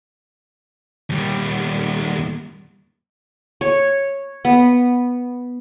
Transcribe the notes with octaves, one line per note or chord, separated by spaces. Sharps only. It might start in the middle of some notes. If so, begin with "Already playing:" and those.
D#2 G3
C#5
B3